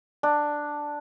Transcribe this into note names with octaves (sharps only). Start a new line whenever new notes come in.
D4